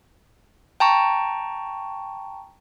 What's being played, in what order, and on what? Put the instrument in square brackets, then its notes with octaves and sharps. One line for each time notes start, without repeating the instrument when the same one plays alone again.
[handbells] G5 A5 A#5 C#6